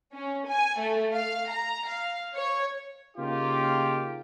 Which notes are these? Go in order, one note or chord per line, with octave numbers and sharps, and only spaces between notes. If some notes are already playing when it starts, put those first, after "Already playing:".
C#4
G#5
A3
F5
A#5
F5
C#5
C#3 A#3 D#4 F4 G4